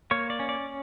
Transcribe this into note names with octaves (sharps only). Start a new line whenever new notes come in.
A#3 C#5
D5
C#4
D5